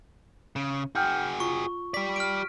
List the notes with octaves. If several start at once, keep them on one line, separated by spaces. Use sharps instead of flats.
C#3
F#4 G#4 G5 F6 G6
F4 C#6
G4 D5 B6
F6 D7